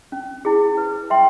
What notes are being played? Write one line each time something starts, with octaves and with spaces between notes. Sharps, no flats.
C#4
E4 G#4
B4
E5 G5 C6